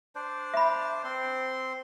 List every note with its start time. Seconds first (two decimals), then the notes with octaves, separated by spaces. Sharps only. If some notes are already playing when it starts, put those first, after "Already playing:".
0.15 D4 C5 D5
0.54 E5 B5
1.04 C4 C6